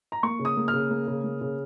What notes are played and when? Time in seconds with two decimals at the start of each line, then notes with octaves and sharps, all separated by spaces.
0.12 A#5
0.23 A#3 C#6
0.39 C#3
0.45 D#6
0.57 A#3
0.68 F6
0.74 C#3
0.91 A#3
1.07 C#3
1.24 A#3
1.41 C#3